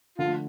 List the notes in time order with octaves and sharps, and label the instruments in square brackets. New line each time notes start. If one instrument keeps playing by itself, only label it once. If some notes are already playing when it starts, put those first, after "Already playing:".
[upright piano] D3 F3 [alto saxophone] F4
[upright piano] A3